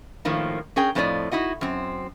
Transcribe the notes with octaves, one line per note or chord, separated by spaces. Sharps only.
A2 D#3 F3 A#3
C#4 G#4 A#4 G5
F2 A2 F3 C#4 D5 D#5
D#4 E4 F#4 D#5
F#2 C4